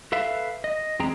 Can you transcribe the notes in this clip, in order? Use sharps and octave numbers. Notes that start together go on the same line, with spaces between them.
A4 B4 E5 F5
D#5
E2 G#3 C4 G#4 G5 A#5